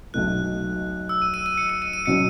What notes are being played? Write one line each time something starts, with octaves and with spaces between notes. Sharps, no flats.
B1 B2 A3 F#6
E6
D#7
D#7
D#7
C#7
D#7
D#7
D#7
B2 F#3 C#4 C#7